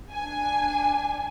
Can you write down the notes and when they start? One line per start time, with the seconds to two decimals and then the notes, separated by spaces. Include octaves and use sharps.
0.12 D4 G#5